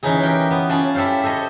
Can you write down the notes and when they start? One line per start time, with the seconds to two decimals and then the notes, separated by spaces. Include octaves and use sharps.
0.03 E3 C#4 D#4 G#4
0.23 G4 A#4 G5
0.51 B3
0.69 C#4 F4 D5 A5 C6
0.95 E4 G4 A4 C5 F5
1.23 A4 C5 C#5 D#5